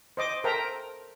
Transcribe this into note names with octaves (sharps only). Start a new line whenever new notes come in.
C5 D#5 D6
A4 A#4 C5 E5 G5 A#5